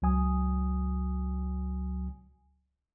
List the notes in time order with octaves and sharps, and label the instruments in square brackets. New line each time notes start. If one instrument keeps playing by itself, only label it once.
[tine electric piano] C#2 F#3 G#5 D#6